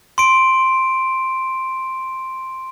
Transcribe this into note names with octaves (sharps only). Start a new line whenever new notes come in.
C6 D7